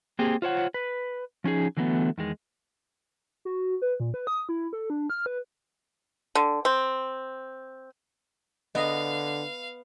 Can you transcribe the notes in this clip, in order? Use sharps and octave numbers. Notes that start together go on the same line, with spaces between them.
A#3 C4 G4 G#4
F4 C5 C#5 F#5
B4
F3 C#4 D#4 G#4
D3 E3 F#3 A3 B3
E2 D#3 G#3
F#4
B4
A#2
B4
D#6
E4
A4
D4
F6
B4
D3
C4
D3 B3 D#5 F5